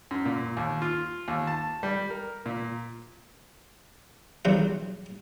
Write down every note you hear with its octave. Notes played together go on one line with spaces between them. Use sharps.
F#2
A#2
D#2
F4
D#2
A5
G3
A#4
A#2
B1 E2 G2 C3 F#3 F#4